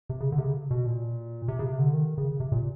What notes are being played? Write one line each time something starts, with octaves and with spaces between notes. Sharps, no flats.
C3
C#3
D3
C3
C#3
B2
A#2
C3
C#3
C3
D3
D#3
C#3
C3
A#2